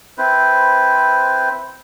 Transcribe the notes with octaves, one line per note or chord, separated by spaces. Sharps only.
C4 E4 B4 C5